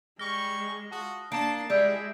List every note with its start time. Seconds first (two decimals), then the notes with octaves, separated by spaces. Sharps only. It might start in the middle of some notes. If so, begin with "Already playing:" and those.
0.19 G3 G#3 C#6 F6 A#6 G7
0.92 F4 F#4 A5 D#6
1.32 A#3 D4 A5 D6 C7 D7
1.70 G3 G#3 E4 E5 E6 G6 D7